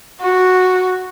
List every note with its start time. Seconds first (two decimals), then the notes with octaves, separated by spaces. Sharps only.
0.21 F#4